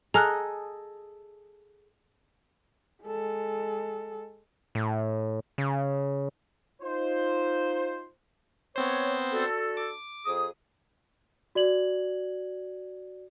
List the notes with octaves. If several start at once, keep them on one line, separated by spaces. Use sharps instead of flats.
G#4 A4 D#5 A#5 F6 F#6
G#3 A4
A2
C#3
D#4 F4 C5
B3 C4 C5 C#5
D4 F#4 A4
D6
F2 G#4 D#6
F#4 D5 G#6 F#7